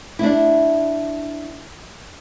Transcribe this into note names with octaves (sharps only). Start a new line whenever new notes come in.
D4 E4